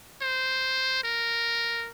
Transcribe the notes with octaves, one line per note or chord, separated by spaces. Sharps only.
C5
A#4